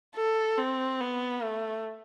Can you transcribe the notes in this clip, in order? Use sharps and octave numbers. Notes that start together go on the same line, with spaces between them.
A4
C4
B3
A3